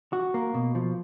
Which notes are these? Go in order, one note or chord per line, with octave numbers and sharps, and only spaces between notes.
F#4
A#3
B2
F3